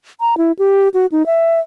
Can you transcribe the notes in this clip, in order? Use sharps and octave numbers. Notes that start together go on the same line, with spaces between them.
A#5
E4
G4
F#4
D#4
E5